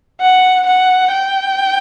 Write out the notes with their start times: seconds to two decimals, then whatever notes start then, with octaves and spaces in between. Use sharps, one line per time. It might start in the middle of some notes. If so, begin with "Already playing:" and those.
0.21 F#5
0.66 F#5
1.12 G5